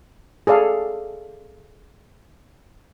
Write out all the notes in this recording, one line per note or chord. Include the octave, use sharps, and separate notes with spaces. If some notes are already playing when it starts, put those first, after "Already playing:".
G#4 A4 D5 F5